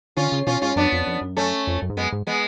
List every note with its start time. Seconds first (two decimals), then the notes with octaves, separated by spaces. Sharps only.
0.17 D3 C#4 F4
0.32 C#3
0.47 B2 C#4 F4
0.62 G#2 C#4 F4
0.76 F#2 B3 D4
0.92 F2
1.07 F2
1.21 F#2
1.37 A3 C#4
1.67 F2
1.82 F#2
1.90 G#2
1.97 F#2 G#3 B3
2.12 G#2
2.27 G#3 B3